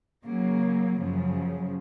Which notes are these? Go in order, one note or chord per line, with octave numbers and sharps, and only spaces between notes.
C#3 F#3 A#3
F#2 C#3 F3